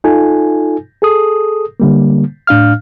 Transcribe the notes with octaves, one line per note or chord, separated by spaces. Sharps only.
D#4 F4 A4 G#5
G#4 A4 D#6
D3 G3 A#3
A2 D4 F5 F6